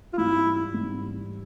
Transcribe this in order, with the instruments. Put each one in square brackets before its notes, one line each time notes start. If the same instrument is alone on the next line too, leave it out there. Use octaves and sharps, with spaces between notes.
[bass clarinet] F4
[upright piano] G#2 E3 G3 C4 D#4 [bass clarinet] E4
[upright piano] G#2 E3 G3 C4 D#4